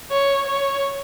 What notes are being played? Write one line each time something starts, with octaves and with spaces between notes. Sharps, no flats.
C#5
C#5